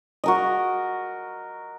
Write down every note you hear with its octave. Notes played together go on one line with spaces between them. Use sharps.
F#4 A#4 D#5